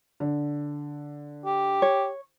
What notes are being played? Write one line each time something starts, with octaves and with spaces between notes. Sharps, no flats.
D3
G4
C#5